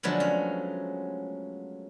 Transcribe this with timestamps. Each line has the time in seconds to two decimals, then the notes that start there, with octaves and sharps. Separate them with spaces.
0.03 D3 F3 F#3 G#3 A3 B3
0.20 C#4